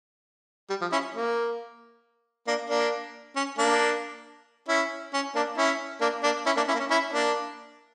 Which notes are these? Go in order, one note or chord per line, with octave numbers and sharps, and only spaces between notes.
G3
F3
C#4 E4
A#3
A#3 D4
A#3 D4
C#4
A#3 D4
C#4 E4
C#4
A#3 D4
C#4 E4
A#3 D4
A#3 D4
C#4 E4
A#3 D4
C#4 E4
A#3
C#4
C#4 E4
A#3 D4